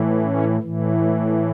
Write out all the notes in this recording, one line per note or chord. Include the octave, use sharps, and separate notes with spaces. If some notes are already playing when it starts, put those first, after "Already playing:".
Already playing: A2 E3
C#4
A2 E3
A3